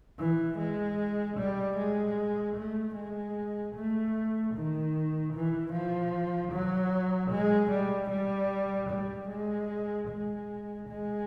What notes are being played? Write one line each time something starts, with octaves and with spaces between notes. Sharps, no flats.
E3
G#3
G3
G#3
A3
G#3
A3
D#3
E3
F3
F#3
G#3
G3
G3
G3
G#3
G#3
G#3